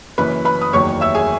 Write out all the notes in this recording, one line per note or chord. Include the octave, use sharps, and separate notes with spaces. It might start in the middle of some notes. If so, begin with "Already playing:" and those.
F#1 F#2 E3 B4 B5
B4 B5
D#6
F#1 E2 D#3 F#3 C#5 C#6
E5 E6
G#4 G#5